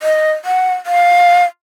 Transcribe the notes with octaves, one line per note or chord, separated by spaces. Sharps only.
D#5
F#5
F5